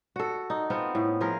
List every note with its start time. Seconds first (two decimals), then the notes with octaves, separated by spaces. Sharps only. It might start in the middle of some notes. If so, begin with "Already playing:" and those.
0.16 F#4 A4
0.50 D#4
0.70 B3 C4 F4
0.95 A2
1.21 F3 G#4 A#4